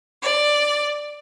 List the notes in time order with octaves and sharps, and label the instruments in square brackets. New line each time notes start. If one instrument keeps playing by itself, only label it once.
[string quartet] D5